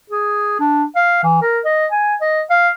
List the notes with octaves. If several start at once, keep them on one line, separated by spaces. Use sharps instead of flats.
G#4
D4
F5
E3
A#4
D#5
G#5
D#5
F5